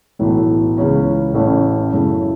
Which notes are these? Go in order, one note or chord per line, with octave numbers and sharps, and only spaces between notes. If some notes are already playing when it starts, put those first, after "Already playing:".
B1 A2 E3 A3 E4
C#2 C#3 E3 C#4
A1 A2 A3 C#4 E4
F#2 C#3 A3 E4